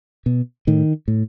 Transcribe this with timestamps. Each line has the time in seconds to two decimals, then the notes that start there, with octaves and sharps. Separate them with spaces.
0.26 B2
0.67 A2 D#3
1.08 A2